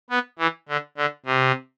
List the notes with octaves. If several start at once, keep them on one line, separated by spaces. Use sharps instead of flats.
B3
E3
D3
D3
C3